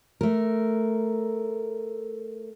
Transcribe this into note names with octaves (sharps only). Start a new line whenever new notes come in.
A3 A#4